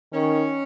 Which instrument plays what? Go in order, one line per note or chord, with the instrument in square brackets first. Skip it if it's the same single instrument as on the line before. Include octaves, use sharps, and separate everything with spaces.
[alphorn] D#3 [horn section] C#4